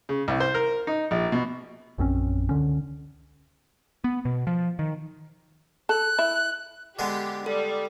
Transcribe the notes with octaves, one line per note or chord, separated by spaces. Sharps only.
C#3
C2
C5
A#4
D#4
A#1
B2
A#1 F#2 C4 C#4
C#2 D3 C#4
B3
B2
F3
D#3
A4 F#6
E4
D3 G#3 B3 G4
G3 A4